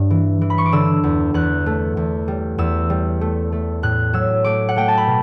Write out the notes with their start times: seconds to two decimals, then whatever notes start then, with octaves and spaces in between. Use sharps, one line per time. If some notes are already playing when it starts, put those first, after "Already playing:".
Already playing: G2
0.10 E3
0.41 E3
0.50 B5
0.58 C#6
0.66 D6
0.73 D3 E6
1.04 E2
1.34 E2 F#6
1.66 A3
1.97 E2
2.28 G3
2.58 E2 E6
2.90 G3
3.21 A3
3.52 A3
3.83 A2 F#6
4.13 F#3 E6
4.44 A3 D6
4.69 F#5
4.76 A3 G5
4.88 A5
4.97 B5
5.07 B2